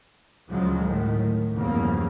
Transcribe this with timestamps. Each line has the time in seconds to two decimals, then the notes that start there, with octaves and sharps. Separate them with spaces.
0.49 D2 C#3 F3 F#3 G#3
0.80 A2 D#3
1.54 E2 G2 C#3 F3 A#3